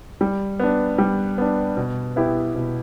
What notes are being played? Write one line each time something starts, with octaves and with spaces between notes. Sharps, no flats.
G3
B3 D4
G3
B3 D4
B2
B3 E4 G4
B2